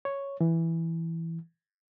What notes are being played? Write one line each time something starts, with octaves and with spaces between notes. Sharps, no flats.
C#5
E3